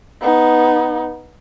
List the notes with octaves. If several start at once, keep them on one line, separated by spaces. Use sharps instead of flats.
B3 D#4